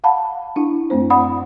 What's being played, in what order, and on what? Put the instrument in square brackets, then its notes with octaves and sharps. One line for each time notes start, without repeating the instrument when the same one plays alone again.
[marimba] F5 F#5 A5 B5
D4 E4
F#2 A3 C4 C5
D5 F#5 B5 D#6